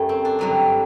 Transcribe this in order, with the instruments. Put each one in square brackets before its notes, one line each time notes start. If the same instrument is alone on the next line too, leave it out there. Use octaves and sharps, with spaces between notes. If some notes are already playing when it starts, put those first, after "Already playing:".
Already playing: [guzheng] F#2 G3 A3 A4
C4
D4
G2 D3 F#3 G3 F#4